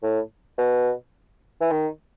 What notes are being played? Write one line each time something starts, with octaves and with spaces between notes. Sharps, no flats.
A2
B2
E3
D#3